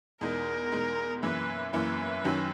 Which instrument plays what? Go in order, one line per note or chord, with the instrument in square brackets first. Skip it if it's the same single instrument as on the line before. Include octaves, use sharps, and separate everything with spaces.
[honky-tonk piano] E2 B2 G#3 D#4 [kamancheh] A#4
[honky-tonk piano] E2 B2 G#3 D#4
[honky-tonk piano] F#2 E3 A#3 E4 [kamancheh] B4
[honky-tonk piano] F#2 E3 A#3 E4 [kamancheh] B4
[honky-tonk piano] F#2 D#3 F#3 C#4